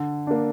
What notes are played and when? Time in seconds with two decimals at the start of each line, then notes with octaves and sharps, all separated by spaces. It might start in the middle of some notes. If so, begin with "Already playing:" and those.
Already playing: D3
0.27 A#3 D4